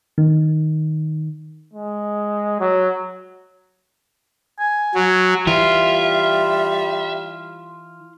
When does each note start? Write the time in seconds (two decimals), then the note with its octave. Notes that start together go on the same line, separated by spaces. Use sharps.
0.18 D#3
1.73 G#3
2.60 F#3
4.60 G#5
4.95 F#3
5.47 E3 G3 F4 E5